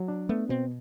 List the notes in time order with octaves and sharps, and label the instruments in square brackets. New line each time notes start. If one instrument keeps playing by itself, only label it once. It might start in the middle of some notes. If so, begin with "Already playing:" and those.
Already playing: [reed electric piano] F#3
D4
[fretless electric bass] A3 [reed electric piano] B3
[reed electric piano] B2 [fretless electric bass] C4